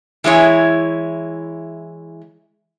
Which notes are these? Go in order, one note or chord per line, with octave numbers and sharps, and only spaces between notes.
E3 G#3 E4 C#5